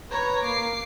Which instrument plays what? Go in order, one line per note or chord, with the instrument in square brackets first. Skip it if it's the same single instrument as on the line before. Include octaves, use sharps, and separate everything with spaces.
[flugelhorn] B4 [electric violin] C#5 A#5
[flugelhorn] A#3 [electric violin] D6 C7